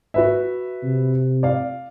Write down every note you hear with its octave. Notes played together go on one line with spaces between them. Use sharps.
F#4 B4 E5
C3
D5 F5